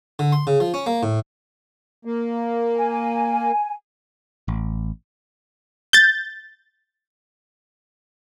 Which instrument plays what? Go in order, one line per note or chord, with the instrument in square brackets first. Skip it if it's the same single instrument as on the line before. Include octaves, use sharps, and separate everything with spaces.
[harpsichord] D3
C6
C#3
F3
C#4
A#3
A2
[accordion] A#3
[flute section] G#5
[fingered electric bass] A1
[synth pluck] G6 A6